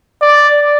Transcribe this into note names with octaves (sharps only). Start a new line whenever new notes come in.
D5